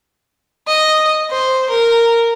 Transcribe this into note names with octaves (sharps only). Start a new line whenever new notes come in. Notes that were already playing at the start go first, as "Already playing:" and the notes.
D#5
C5
A#4